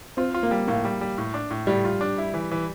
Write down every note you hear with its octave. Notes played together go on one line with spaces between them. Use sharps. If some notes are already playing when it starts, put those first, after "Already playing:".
C4 F4
F4
A#3
G3
A2 A#3
G3
G3
A2
D4
A2
A2 G3
F4
D4
E4
E3
E3